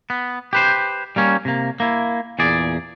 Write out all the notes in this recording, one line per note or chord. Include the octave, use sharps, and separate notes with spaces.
B3
G4 B4 C5
G3 A#3 C#4
C3 A#3
A#3 E4
E2 A#2 G#4 D5